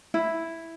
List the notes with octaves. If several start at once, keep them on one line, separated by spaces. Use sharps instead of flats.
E4